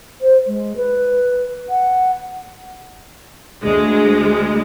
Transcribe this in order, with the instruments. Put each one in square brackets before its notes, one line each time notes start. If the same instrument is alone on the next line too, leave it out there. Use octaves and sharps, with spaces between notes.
[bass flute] C5
G#3
B4
F#5
[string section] D2 G#3